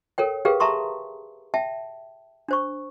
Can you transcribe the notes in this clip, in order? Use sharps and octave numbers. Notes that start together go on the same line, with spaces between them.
A4 A#4 C#5 G5
G4 G#4 A#4 B4 F5 G5
E5 A5 A#5 C6 C#6 D#6
E5 G5 A5
D4 C5 C#6